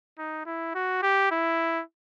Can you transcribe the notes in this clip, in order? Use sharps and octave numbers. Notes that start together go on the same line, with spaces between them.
D#4
E4
F#4
G4
E4